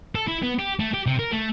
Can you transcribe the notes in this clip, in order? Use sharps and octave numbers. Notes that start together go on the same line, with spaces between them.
A4
E4
B3
G4
A3
G4
C3
A#4
A3